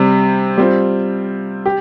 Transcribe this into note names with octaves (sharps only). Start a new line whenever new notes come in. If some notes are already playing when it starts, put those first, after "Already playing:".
Already playing: C3 G3 C4
G3 C4 F4
G4